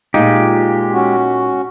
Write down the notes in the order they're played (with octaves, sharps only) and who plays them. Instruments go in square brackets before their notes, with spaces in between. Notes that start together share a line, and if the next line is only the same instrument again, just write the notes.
[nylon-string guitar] A#2 F4 [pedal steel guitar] G#3 G4 [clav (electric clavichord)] D#4
[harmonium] C#4 F#4